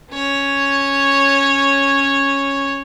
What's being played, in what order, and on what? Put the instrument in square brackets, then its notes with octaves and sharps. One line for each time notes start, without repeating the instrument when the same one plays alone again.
[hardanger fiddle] C#4 C#5